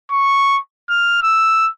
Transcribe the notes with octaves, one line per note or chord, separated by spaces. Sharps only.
C#6
F6
E6